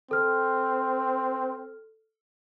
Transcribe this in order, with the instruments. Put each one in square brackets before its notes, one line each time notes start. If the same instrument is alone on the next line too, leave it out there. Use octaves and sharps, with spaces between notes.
[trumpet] C4 [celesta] A4 F6